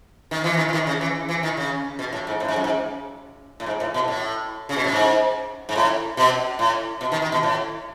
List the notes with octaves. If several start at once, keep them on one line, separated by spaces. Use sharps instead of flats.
D#3
E3
D#3
E3
D#3
C#3
E3
E3
D#3
C#3
B2
A2
G#2
A2
G#2
F#2
G#2
A2
G#2
A2
B2
A2
C#3
B2
A2
G#2
G#2
A2
B2
A2
B2
D#3
D#3
B2
A2